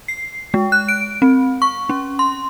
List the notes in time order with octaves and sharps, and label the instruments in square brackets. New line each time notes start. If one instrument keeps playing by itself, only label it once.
[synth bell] C7
G#3
F#6
D7
C4
C#6
C#4
C6